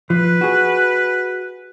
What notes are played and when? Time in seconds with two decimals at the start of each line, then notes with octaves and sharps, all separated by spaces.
0.10 F3 B4
0.41 F#4 G#4